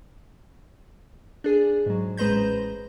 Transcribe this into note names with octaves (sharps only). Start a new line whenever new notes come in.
D4 G#4
G#2 F#3
A1 G#3 B4 C5 A#5 G6